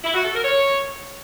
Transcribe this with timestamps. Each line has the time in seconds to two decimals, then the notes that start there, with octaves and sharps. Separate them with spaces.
0.04 E4
0.14 F#4
0.24 A4
0.34 A#4
0.44 C#5